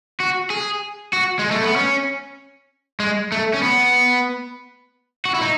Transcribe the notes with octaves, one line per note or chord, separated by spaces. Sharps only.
F#4
G#4
F#4
G#3
A3
B3
C#4
G#3
A3
C#4
B3
F#4
E4
D#4